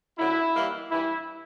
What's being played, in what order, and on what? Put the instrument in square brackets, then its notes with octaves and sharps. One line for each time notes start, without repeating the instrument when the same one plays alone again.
[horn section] F#2 D3 F#3 A3 E4
E3 G3 A#3 D#4
G2 E3 G3 E4